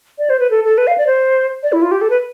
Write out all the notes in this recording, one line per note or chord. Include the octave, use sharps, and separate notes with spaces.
D5
C5
B4
A4
A4
B4
F5
D5
C5
D5
E4
F4
G4
A4
B4